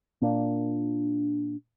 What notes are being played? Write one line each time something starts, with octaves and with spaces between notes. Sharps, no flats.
A#2 A#3 D4